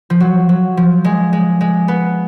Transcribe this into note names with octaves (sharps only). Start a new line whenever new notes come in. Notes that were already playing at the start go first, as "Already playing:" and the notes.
F3
F#3
F#3
F3
G#3
G#3
G#3
B3